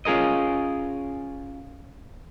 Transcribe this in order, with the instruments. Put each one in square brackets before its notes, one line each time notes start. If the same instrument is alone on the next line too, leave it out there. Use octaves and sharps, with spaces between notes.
[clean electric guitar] C#4 F4 G#4 A#4 D#5